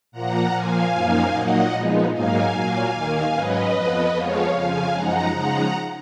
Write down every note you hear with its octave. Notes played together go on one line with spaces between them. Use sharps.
A#2 F3 A#3 F#5 A#5
A#2 F3 A#3 F5 G#5
F#2 F3 A#3 D#4
A#2 F#3 A#3 D#4 D#5 F#5
A#2 F3 G#3 B3 D#4
G#2 F#3 A#3 D#4 F5 G#5
A#2 F#3 A#3
D#2 D#3 A#3
G#2 F#3 C#4 B4 D#5
F2 F3 B3
F2 F3 G#3 B3 C#5 F5
F2 C#3 F3 F5 G#5
F#2 F3 G#3 D#4 F#5 A#5
C#3 F3 G#3 D#4 F#5 A#5